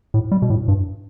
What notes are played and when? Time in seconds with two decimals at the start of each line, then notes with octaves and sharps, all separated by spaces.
0.14 A2
0.32 G3
0.42 B2
0.50 A2
0.68 G2